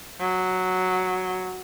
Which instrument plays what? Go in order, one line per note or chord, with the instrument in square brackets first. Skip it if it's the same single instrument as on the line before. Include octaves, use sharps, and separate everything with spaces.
[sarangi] F#3